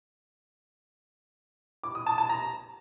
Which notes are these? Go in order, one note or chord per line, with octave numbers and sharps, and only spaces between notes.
D6
D#6
A5
A5
A#5